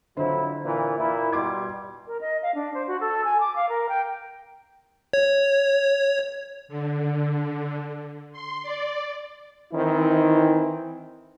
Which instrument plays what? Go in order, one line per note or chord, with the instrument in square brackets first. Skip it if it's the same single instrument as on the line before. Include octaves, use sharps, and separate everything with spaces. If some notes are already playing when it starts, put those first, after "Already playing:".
[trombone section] F2 F#3 E4 [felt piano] D3 C5
[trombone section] A#2 E3
A#2 E4
[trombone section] B2 G3 [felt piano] C6 D6 G#6
[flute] A#4
D#5
F5
D4
C5
F#4
A4
G#5
D6
F5
A#4
G5
[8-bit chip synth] C#5
[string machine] D3
C6
D5
[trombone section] D#3 E3 C4 D#4 E4